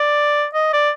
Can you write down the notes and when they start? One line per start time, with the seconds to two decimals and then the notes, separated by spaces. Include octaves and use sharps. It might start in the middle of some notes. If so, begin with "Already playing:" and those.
Already playing: D5
0.54 D#5
0.73 D5